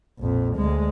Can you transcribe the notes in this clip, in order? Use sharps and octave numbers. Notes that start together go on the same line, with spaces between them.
A#1 F2
D2 G#3